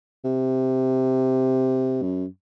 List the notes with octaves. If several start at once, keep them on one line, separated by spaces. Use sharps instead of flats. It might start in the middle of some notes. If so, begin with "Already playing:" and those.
C3
F#2